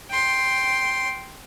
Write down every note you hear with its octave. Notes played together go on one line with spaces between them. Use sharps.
G5 C6